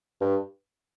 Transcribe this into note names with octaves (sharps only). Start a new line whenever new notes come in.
G2